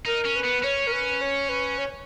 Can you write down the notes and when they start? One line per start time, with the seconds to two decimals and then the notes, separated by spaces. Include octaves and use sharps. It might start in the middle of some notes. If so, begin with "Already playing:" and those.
0.06 D#4 A#4
0.25 C#4
0.35 B4
0.45 B3
0.63 C#4 C#5
0.87 A#4
0.92 B4
1.21 C#5
1.49 B4
1.78 C#5